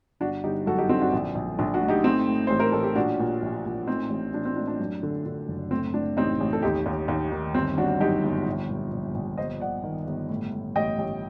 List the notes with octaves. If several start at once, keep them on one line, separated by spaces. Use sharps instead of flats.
G1 D4 F#4
G1 D#4 G4
F#2 F#4 A4
D#4 G4
D3 C4 D#4
D4 F#4
A#1 D4
A#1
A#1 D4
D4 F#4
A2
D#4 G4
A2 C4 D#4
A2
A1 C5
A#4
A1 A4
G4
A#2 D4 F#4
A#2
A#1
A#2
A2 C4 D#4
A1
A1 D4
C4
A2 D4
D4
F#2
D3
D3
F#1
A2 C4
A2 D4
A1 C4 D#4
A1
A4
D#2 D#4 G4
D#2
D#2
D#3
G1 C4
G1 D4 F#4
F#2 D#4 G4
G1
A#1
A#2
A#1
A#1
G1 C5 D#5
G1 D5 F#5
D#3
G1
A2
A2
A1 D#5 G5
A1